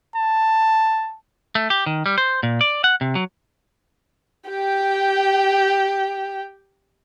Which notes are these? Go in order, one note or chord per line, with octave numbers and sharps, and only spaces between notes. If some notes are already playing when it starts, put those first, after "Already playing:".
A5
A3
G4
D#3
G3
C5
A#2
D5
F#5
C3
F#3
G4 G5